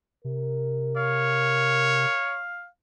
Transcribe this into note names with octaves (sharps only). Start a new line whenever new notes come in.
C3 A#4
C#5 F5